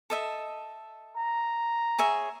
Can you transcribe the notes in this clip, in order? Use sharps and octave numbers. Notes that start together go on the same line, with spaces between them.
A4 D#5 E5
A#5
G#4 C#5 E5